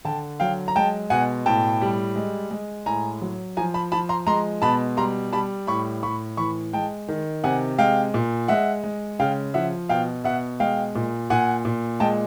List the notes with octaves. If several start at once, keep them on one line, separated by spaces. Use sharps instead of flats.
D3 G5 A5
F#3 F5 G5
A#5
G#3 G5 A5
B2 F#5 G#5
A2 G5 A5
G3
G#3
G#3
A2 G#5 A#5
F#3
F3 G#5 A#5
A5 B5
F3 A5 B5
A#5 C6
G#3 A#5 C6
B2 A5 B5
G3 A#5 C6
G3 A5 B5
A2 B5 C#6
A2 B5 C#6
E3 B5 C#6
G#3 G5 A5
D#3
C3 F#5 G#5
G#3 F5 G5
A#2
G#3 E5 F#5
G#3
C#3 F5 G5
F3 E5 F#5
B2 F5 G5
B2 E5 F#5
G#3 F5 G5
A#2
A#2 F#5 G#5
A#2
G#3 G5 A5